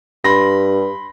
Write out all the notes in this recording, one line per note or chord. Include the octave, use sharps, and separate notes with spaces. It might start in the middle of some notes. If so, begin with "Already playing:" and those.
G2 B5 C6 A#6